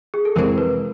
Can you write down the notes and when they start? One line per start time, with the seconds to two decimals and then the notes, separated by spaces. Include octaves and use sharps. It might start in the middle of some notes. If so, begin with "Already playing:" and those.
0.14 G#4
0.25 A4
0.36 F2 C3 E3 G#3 C4 A#4
0.58 B4